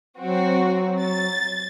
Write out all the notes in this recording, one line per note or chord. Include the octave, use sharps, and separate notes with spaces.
F#3 C4 F#4
A6